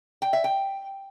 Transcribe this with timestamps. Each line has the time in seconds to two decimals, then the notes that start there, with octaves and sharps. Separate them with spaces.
0.22 G5
0.33 E5
0.44 G5